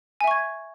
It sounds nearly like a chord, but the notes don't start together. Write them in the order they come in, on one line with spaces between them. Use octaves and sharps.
G#5 E5 C#6 G#6